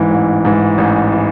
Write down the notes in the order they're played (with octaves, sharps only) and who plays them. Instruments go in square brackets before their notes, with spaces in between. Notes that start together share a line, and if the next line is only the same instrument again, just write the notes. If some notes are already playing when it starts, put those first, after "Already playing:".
Already playing: [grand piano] A1 G#2 E3
A1
G#2 E3
A1
E3